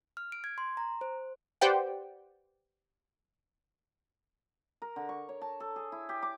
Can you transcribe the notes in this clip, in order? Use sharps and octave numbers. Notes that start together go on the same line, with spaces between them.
F6
D7
G#6
C6
A#5
C5
G4 B4 C5 D5 F#5 G5
A#4
D3
C#6
C#5
A5
A4
G#4
E4
G4
D6